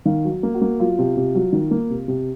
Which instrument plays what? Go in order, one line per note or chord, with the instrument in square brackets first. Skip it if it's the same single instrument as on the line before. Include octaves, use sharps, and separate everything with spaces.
[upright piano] D#3 F5
F#3
A#3
F#4
A#3
F#3 F4
C3
C3
F#3
D#3
A#3
C3
C3